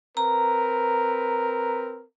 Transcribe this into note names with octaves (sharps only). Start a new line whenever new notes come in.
C4 A#4 B4 A#5